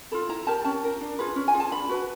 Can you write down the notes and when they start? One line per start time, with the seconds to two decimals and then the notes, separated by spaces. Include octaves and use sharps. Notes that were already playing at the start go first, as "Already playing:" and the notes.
0.12 F4 A4 B5
0.29 E4 A#5
0.47 G4 A#4 A5
0.64 C#4 A5
0.83 F4 A#4
1.01 D4
1.19 F4 G#4 B4
1.36 C#4
1.48 G#5
1.54 F4 G#4
1.60 A5
1.71 D4 B5
1.89 F#4 B4